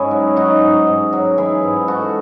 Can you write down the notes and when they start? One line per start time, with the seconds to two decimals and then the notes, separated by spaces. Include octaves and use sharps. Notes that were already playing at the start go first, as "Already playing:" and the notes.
Already playing: G#2 C#4 E4 F#4 G#4
0.11 F#3
0.36 F#3 D#4 F#4
0.62 G#2
0.87 G#2
1.13 F#3
1.37 E3 E4 G#4
1.63 G#2
1.88 G#2 F#4 A4